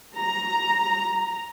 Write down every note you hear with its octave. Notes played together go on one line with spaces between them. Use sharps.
A#5